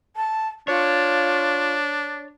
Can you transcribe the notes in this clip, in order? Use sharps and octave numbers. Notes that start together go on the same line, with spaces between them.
A5
D4 F4 C#5